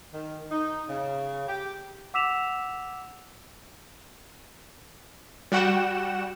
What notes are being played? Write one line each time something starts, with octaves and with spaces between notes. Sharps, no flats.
D#3
D#4
C#3
G4
F#5 D6 E6 B6 E7 F7
G3 F#4 F#5 G5 E7